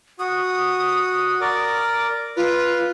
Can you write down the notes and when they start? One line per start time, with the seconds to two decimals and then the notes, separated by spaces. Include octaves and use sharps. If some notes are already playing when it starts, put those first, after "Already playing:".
0.19 F#4 D#6
1.41 A#4 D5 D6
2.37 F4 B4